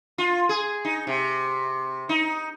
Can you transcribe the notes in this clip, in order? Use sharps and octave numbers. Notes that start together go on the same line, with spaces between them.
F4
G#4
D#4
C3
D#4